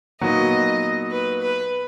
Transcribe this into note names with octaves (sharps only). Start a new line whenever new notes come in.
A#2 F#3 B3 D#4 F#4 D#5
B4
B4